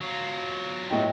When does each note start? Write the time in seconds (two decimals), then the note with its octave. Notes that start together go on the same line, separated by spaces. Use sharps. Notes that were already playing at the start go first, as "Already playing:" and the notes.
0.01 F#3 F4
0.90 A2 D#5 G5